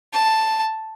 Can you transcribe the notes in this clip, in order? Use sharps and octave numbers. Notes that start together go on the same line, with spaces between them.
A5